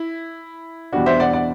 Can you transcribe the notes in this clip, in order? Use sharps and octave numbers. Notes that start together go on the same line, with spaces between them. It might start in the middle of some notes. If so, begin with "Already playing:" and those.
Already playing: E4
E2 B2 G3 D4 F#4
C5 E5
D5 F#5
D5 F#5